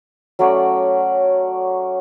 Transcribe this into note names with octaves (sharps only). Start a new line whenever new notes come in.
F#3 A3 C#4 D5